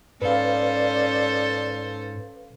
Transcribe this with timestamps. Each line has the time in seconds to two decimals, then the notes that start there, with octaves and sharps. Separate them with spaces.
0.22 G#2 C#4 A4 B4 C5 D5 F5